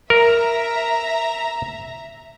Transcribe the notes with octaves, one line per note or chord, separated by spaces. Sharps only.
A#4 E5 A#5